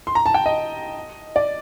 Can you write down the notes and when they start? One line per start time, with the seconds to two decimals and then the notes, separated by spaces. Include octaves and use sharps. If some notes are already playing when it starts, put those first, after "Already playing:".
0.07 C6
0.15 A#5
0.26 A5
0.34 G5
0.46 D#5
1.36 D5